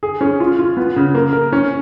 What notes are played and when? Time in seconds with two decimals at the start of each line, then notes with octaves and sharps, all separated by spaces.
0.03 G#4
0.21 C#4
0.40 F4
0.59 F4
0.77 B3
0.96 C#3
1.15 A#3
1.33 A#4
1.53 C#4